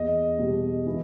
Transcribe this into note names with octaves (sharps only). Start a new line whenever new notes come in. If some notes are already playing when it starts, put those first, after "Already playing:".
Already playing: E2 D#5
B2 G3
E3